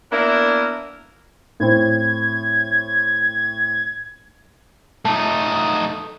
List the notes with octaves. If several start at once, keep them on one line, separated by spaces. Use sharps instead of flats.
A#3 B3 D4 E4 A#4
A2 C4 G#6
A3 D#4 A5